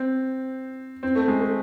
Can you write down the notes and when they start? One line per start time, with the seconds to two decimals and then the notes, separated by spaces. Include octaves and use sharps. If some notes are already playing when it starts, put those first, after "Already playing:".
Already playing: C4
1.03 C4
1.15 A3
1.28 G#3
1.41 A3